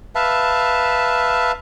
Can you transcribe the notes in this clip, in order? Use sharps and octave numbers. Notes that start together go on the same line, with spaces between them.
B4 E5 F5 A5